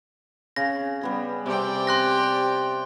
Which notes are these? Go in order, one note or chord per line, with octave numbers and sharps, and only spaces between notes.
C#3 A#6
G3 B3 G#4
C3 C4 G4 D5 G5
C6 F#6 A#6